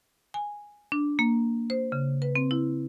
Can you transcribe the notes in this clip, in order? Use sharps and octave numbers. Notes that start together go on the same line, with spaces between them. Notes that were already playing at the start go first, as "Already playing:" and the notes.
G#5
D4
A#3
C5
C#3
B4
C4
E4